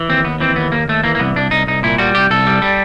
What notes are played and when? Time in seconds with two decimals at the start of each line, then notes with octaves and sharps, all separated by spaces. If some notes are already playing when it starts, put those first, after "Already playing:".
Already playing: E3
0.09 D#2 C4
0.24 D#2 B3
0.40 E3 C4
0.56 D#2 B3
0.72 D#2 A#3
0.88 D#2 A3
1.04 E3 A#3
1.15 A#3
1.19 C2 B3
1.36 C2 D4
1.51 C2 D#4
1.67 C2 D#4
1.83 A#2 E4
1.98 G3 F#4
2.15 C2 G4
2.30 C2 A4
2.47 G3
2.62 G3